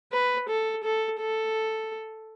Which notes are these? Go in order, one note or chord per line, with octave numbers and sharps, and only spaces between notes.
B4
A4
A4
A4